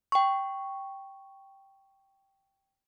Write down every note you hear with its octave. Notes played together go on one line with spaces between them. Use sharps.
G5 C#6